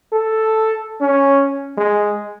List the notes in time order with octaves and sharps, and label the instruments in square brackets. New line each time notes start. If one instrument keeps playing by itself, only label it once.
[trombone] A4
C#4
G#3